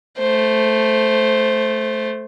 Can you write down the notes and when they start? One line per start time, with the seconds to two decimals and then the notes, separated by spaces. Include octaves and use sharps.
0.18 A3 C5